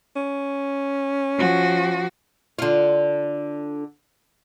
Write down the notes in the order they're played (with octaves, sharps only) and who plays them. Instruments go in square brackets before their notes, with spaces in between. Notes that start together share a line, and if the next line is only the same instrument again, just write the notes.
[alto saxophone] C#4
[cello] F3 F#4
[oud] D3 F4